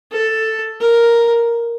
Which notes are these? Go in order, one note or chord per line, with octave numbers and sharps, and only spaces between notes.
A4
A#4